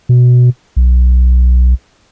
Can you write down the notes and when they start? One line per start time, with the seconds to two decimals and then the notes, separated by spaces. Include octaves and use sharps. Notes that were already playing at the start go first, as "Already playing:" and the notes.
0.09 B2
0.77 B1